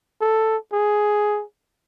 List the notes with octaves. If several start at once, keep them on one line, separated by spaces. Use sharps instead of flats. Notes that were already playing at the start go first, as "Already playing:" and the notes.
A4
G#4